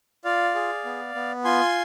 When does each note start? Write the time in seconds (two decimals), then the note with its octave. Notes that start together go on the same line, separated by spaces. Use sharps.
0.24 F4 D5 F5
0.55 G#4
0.85 B3
1.15 B3
1.44 F4 G#5 C6